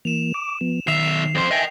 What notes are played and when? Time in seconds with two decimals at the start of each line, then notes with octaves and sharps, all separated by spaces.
0.05 E3 A#3 E7 F7
0.34 D6
0.61 F3 B3
0.87 B1 D#3 E5 C7 F7
1.35 F2 C5
1.51 D#5 E5 G5 G#5